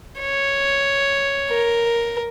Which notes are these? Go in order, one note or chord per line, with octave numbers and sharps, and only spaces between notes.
C#5
A#4